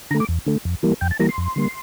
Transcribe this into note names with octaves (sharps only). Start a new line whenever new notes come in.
D3 A3 A#5
D6
E2
D3 A3
F2
E3 G3 A#3
F2 G5
A5
E3 G3 A#3 A#5
C6
F2
D3 G3 A#3